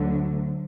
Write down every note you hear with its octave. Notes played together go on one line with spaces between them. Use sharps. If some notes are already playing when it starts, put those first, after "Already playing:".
Already playing: D2 D3 F#3